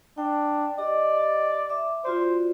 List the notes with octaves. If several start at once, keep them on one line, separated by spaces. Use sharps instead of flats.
D4 G5
G4 D5 D#5
E5 D6
F4 F#4 C5 D5